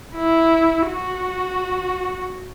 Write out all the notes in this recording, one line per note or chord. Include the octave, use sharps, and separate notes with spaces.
E4
F#4